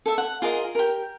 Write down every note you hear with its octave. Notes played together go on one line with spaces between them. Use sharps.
A4 E5
F#5
F4 G#4 A#4 D#5
G4 A#4